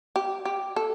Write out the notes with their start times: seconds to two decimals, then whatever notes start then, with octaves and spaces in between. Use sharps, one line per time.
0.16 G4
0.45 G4
0.76 A4